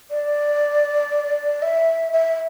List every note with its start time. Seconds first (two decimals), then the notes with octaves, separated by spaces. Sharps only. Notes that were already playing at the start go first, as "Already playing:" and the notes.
0.11 D5
1.62 E5
2.13 E5